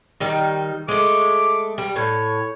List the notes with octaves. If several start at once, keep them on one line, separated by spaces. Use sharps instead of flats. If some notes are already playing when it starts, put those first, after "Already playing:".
D#3 G3 D#4
G#3 A3 D6
G3
A2 C#5